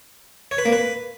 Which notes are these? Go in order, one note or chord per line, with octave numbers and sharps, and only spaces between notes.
C#5
B4
A#3
B4